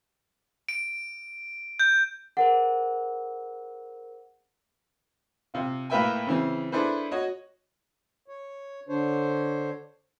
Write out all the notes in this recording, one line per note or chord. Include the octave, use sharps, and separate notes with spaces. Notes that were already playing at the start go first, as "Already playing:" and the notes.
D7
G6
G#4 A#4 C5 F#5
C3 F4
A2 A#3 B4 E5 G5 G#5
C#3 E3 C4
D4 E4 G#4 A4 B4 C5
F#4 C#5 D#5
C#5
D3 D4 C5 C#5